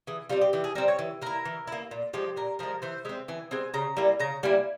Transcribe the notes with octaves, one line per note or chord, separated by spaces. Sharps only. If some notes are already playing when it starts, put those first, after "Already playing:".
E3 G#4
G3 C4 F4
G4
E3 G4
G#4
G3 C4 A#4
C#5
E3
A#3 E4 A#4
E3
A#3 E4
A#2
F3 G#3 G4
A#2 A#4
F3 G#3 A#4
E3 C5
G#3 C4 E5
E3 G#5
G#3 C4 G#5
C#3 A#5
G3 A#3 E4
C#3 A#5
G3 A#3 E4 G#5